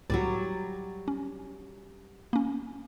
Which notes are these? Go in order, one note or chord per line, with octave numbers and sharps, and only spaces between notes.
C#2 A2 F#3 G3 D5
C#4
A#3 C#4